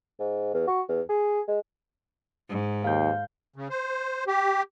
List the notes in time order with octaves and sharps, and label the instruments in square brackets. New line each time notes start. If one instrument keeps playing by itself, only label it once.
[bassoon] G#2
E2
F#4
E2
G#4
G#3
[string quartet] G#2
[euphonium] D#2 [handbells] F5 G6
[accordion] C#3
C5
G4